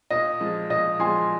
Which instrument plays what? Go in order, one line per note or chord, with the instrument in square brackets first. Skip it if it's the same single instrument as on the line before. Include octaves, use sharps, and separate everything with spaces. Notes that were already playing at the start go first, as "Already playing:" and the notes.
[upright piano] A#2 [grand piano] D#5
[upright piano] F3 G#3
[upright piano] A#2 [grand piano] D#5
[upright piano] F3 G#3 [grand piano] G#5 C6